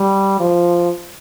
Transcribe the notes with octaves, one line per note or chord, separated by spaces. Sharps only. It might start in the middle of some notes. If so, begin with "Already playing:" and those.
Already playing: G3
F3